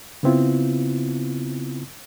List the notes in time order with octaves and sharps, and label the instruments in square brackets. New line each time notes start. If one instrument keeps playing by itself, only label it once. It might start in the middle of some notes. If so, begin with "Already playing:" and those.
[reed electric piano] C#3 B3 C4 E4 F4